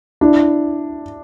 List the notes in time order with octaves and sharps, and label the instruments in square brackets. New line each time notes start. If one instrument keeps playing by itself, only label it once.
[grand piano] D4 E4